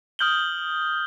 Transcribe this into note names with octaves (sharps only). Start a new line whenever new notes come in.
D#6 F6 G6 F#7 G7